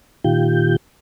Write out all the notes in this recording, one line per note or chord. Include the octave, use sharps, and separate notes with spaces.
A#2 D#3 F4 G4 G6